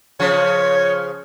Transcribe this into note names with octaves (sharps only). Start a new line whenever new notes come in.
C#3 F3 C#5